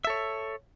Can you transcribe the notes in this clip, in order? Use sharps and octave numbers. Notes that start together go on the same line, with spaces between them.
A4 C#5 E5